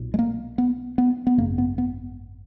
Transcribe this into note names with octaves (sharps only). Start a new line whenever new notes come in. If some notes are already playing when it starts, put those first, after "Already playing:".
Already playing: B1 A#2
G#3
A#3
B3
B3
B3
G#1 F#2 C#3 A#3
B3
B3